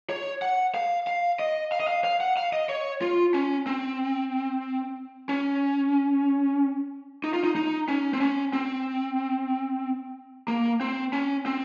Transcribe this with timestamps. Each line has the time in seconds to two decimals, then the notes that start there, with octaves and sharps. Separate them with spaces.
0.10 C#5
0.42 F#5
0.75 F5
1.07 F5
1.39 D#5
1.72 F5
1.80 D#5
1.88 F5
2.04 F5
2.20 F#5
2.37 F5
2.53 D#5
2.69 C#5
3.02 F4
3.34 C#4
3.67 C4
5.29 C#4
7.24 D#4
7.33 F4
7.44 D#4
7.56 D#4
7.88 C#4
8.13 C4
8.21 C#4
8.53 C4
10.48 A#3
10.81 C4
11.13 C#4
11.46 C4